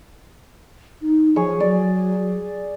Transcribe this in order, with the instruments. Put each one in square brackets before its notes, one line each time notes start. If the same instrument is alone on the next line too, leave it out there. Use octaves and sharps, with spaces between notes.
[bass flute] D#4
[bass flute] F3 [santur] G#4 C#5 C#6
[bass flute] F#3 [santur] D5